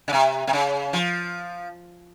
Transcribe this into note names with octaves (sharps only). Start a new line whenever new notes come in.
C#3
C3
C3
C#3
F3